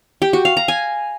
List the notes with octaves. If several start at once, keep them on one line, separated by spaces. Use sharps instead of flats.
G4
F#4
F5
A#5
G#5